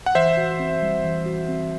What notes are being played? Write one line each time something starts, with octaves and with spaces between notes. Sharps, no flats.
F#5
E3 C5 E5
F#4
C4
G3
E3
F#4
C4